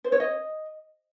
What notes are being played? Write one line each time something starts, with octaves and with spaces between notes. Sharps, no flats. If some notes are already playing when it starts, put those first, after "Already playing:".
C5
C#5
D#5